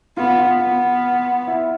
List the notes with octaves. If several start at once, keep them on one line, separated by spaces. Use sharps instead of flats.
B3 F4
F4
B3
E4